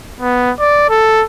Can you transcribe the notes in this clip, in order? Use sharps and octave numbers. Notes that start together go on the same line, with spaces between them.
B3
D5
A4